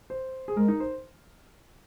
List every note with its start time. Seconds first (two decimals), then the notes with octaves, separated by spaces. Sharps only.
0.10 C5
0.48 G#4
0.56 G#3 A#4
0.68 D#4
0.80 C5